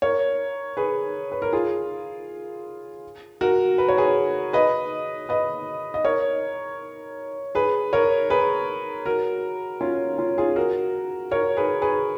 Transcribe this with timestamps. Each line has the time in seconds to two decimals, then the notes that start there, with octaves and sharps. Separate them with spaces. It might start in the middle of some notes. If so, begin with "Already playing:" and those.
0.02 A#4 C#5
0.77 G#4 B4
1.32 B4
1.42 A#4
1.53 F4 G#4
3.41 F#4 A#4
3.78 B4
3.89 C#5
3.97 G#4 B4
4.53 B4 D#5
5.29 B4 D#5
5.94 D#5
6.05 A#4 C#5
7.55 G#4 B4
7.93 A#4 C#5
8.30 G#4 B4
9.06 F#4 A#4
9.81 C#4 F4
10.18 C#4 F4
10.38 F4 G#4
10.56 F#4 A#4
11.31 A#4 C#5
11.57 G#4 B4
11.82 G#4 B4